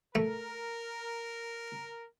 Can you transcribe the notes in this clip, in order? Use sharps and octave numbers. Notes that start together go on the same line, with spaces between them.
A3 A#4